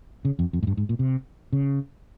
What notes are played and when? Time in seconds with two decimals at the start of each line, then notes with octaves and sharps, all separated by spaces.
0.25 C#3
0.39 F2
0.53 F2
0.63 G#2
0.67 G2
0.77 G#2
0.89 A#2
0.99 C3
1.53 C#3